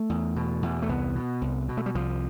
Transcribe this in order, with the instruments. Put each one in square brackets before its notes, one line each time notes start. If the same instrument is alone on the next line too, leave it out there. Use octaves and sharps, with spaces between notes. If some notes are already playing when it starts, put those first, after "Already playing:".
Already playing: [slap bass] A3
E2
B2
E2
A3
C2 B3
B2
C2
B2
A3
G3
C2 F3